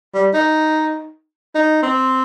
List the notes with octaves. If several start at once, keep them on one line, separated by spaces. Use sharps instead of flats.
G3
D#4
D#4
C4